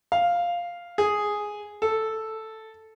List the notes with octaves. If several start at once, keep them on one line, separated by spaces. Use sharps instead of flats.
F5
G#4
A4